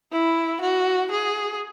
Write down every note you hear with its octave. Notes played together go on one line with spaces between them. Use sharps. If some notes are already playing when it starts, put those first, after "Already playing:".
E4
F#4
G#4